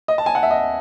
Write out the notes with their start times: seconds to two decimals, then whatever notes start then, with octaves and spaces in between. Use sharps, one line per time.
0.08 D#5
0.18 A5
0.26 G#5
0.35 F#5
0.43 E5
0.51 D#5